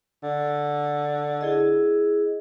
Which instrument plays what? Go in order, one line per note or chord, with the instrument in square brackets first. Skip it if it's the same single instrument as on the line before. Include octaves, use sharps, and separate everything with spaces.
[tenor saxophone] D3
[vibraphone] E4 G#4 D#5